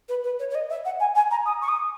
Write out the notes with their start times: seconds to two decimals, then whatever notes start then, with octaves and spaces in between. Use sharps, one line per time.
0.08 B4
0.23 B4
0.39 C#5
0.50 C#5
0.54 D#5
0.69 E5
0.84 F#5
0.99 G#5
1.15 G#5
1.30 A#5
1.45 D#6
1.61 C#6
1.68 D#6